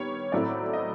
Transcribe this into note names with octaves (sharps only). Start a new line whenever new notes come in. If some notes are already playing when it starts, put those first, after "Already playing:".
Already playing: D#3 G3 B3 C#5
A2 F#3 A3 C4 E4 D5
D#5